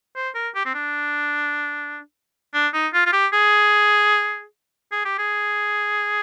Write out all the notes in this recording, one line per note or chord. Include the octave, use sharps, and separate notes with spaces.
C5
A#4
G4
C4
D4
D4
D#4
F4
F4
G4
G#4
G#4
G4
G#4